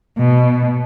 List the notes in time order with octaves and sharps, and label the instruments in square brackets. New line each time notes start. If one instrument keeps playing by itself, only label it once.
[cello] B2